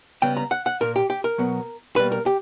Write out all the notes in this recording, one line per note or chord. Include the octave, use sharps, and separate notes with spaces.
C#3 G3 B3 G5
A#5
F#5
F#5
A#2 A#3 A#4
G4
G4
A#4
B2 F#3 B3
B2 G3 A#3 B4
A#4
G4